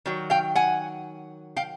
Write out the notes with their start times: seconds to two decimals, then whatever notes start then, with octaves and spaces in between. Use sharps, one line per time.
0.06 D#3 F#3
0.30 F5 G5
0.55 F#5 G#5
1.56 F5 G5